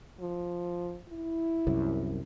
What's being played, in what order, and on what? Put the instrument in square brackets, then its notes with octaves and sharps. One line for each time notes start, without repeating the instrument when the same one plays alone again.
[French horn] F3
E4
[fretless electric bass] C2 F#2